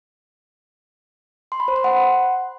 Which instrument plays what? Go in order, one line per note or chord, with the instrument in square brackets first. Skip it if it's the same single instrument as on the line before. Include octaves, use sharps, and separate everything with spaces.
[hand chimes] C6
B5
C5
C6
F#5